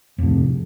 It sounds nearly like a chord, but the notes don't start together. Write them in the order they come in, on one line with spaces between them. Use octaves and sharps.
F2 A2 C3